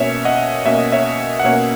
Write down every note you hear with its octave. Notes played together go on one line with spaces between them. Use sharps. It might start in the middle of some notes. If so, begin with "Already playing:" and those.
Already playing: B2 A#3 C#4 C#5 E5
D#5 F#5
B2 A#3 C#4 E5
D#5
C#5 E5
F#5
B2 A#3 C#4 C#5 E5